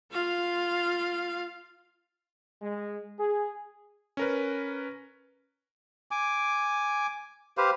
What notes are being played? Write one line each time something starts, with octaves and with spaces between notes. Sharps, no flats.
F4 F5
G#3
G#4
C#4 A#4 B4
G#5 D6
G4 B4 C5 F5